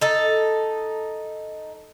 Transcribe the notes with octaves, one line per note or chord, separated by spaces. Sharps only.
D#4 A4